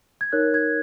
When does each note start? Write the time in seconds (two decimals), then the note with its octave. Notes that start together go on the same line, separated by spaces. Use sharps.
0.21 G#6
0.32 D#4 A#4 C#5 F#6
0.54 G#6